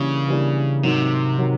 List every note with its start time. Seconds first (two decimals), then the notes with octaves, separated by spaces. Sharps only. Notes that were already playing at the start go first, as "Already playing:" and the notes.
Already playing: C#3 E3 G3 A#3 D4
0.28 E3 G3 A#3 D4
0.83 G#2 C3 D#3 F#3
1.38 D#3 F#3